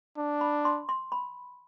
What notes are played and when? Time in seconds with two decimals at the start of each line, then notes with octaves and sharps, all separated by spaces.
0.17 D4
0.41 B5
0.65 C6
0.89 C6
1.12 B5